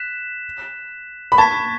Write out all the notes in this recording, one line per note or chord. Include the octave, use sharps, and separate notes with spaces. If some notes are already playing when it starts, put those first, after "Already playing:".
Already playing: F#6 B6 E7
B5
A5 C#6 G#6 B6